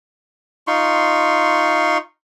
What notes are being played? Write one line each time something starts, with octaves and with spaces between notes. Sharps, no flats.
D#4 F4 C6 C#6